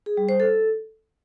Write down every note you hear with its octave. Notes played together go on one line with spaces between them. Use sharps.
G#4
G3
C5
A4